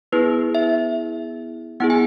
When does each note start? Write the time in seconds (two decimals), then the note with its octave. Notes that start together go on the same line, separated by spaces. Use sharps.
0.12 B3 E4 G#4 B4
0.55 E5
1.80 B3 E4 G#4 F#5
1.90 G#5